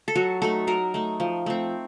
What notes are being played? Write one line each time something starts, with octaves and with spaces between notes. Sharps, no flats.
A4
F#3 F#4
A3 D#4 A4
F#3 A#4
A3 D#4
F3
A3 C4